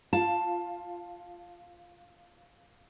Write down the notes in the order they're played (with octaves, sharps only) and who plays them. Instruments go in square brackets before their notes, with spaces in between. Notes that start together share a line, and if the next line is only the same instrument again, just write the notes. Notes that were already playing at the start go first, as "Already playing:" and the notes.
[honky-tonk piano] F4 [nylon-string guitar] A5